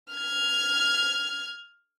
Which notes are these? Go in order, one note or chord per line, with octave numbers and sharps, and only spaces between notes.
F6 G#6